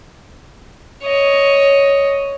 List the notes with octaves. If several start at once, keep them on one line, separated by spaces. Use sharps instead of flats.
C#5 D#5